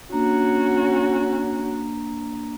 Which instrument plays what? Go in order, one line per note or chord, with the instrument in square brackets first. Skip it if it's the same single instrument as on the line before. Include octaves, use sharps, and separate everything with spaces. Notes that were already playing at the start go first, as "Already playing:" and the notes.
[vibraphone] A#3 D4 A#5 [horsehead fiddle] C#4 F#4